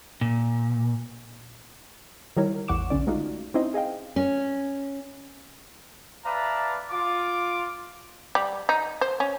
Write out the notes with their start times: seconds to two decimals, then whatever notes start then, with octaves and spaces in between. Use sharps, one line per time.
0.21 A#2
2.36 D#3 G3 E4 A#4 C#5
2.68 A1 E2 F#5 C#6 D6 E7
2.90 B1 D3 C#4 D5
3.07 G#3 A3 D#4 F4 F#4
3.54 C4 C#4 D#4 E4 C5 D#5
3.74 G#4 D#5 F5 G5
4.16 C#4
6.25 B4 D5 E5 F5 A5 A#5
6.91 F4 D6
8.35 G3
8.69 D#4
9.01 C5
9.20 C#4